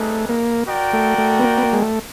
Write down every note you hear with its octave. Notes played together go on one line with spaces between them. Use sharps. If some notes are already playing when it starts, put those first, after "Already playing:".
Already playing: G3 A3 C4 D#4 G#4 B4
A#3
F#4 A#4 D5 G5
A3
A3
B3
A#3
B3
A#3
G#3
A3